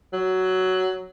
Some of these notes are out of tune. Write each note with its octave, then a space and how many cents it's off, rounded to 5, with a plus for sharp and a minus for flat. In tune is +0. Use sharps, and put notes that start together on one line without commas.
F#3 +10